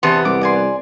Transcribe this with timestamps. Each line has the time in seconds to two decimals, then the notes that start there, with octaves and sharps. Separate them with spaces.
0.03 E2 C3 B3 D4 C6 C#6
0.25 C2 D6
0.41 D5 G#5 C6